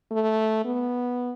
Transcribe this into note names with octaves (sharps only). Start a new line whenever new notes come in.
A3
B3